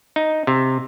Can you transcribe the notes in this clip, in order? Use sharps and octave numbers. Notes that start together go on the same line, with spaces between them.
D#4
C3